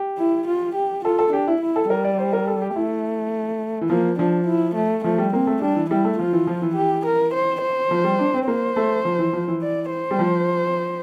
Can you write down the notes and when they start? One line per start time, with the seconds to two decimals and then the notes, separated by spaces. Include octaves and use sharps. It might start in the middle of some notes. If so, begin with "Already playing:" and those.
Already playing: G4
0.18 E4
0.47 F4
0.75 G4
1.05 F4 A4
1.19 A4
1.32 D4 G4
1.48 E4
1.61 E4
1.76 A4
1.90 G3 A#4
2.04 D5
2.18 C5
2.33 A#4
2.47 A4
2.62 G4
2.76 A3 E4
3.81 E3
3.89 F3 A#3
4.19 F3 D4
4.47 E4
4.75 A3
5.04 F3 A3
5.18 G3
5.33 A#3 C4
5.47 A3
5.62 G3 D4
5.76 E3
5.90 G3 E4
6.05 A3
6.19 F3 F4
6.33 E3
6.47 F3
6.62 E3
6.76 G4
7.05 A#4
7.34 C5
7.62 C5
7.91 F3
8.04 G3
8.19 D4
8.34 C4
8.47 A#3 C5
8.76 A3
9.05 F3
9.19 E3
9.33 F3
9.48 E3
9.62 D5
9.91 C5
10.11 G3
10.19 F3